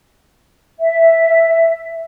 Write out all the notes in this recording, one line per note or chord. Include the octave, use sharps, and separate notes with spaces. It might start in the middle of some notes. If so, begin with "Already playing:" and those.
E5